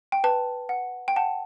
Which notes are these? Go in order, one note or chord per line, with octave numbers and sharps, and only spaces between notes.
G5
B4 A5
F#5
G5
F#5 A5